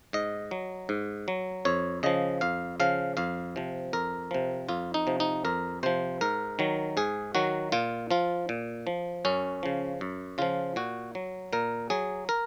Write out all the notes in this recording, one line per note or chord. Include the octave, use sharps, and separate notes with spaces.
G#2 D#5
F#3
G#2
F#3
F2 C#5
C#3 F3 D#5
F2 F5
C#3 F3 F5
F2 F5
C3 F3
F2 A#4
C3 F3
F2 F4
D#4
C3 F3
D#4
F2 A#4
C3 F3 C5
G#2 A#4
D#3 F#3
G#2 G#4
D#3 F#3 F#4
A#2 F4
F3 F4
A#2
F3
F#2 C#4
C#3 F3
F#2
C#3 F3 F4
A#2 F#4
F#3
A#2 A#4
F#3 G#4
A#4